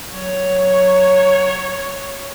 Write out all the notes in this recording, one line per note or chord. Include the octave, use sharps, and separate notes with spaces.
F#3 C#5